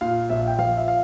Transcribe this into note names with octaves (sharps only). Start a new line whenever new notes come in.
A#2 F5
A#1 E5
G5
F3 F5
E5
F5